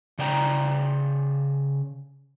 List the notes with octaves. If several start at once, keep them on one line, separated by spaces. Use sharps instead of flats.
C#3 D5 G5 A#5